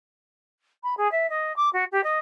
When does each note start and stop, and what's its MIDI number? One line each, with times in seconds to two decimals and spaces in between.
0.83 0.94 83
0.97 1.10 68
1.11 1.29 76
1.29 1.54 75
1.56 1.69 86
1.73 1.84 66
1.91 2.01 67
2.03 2.19 75